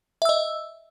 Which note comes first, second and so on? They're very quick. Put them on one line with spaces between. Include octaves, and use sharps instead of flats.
E5 E6 D#5